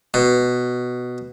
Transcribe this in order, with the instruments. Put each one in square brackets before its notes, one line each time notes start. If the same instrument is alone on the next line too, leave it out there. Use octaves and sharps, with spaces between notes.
[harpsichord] B2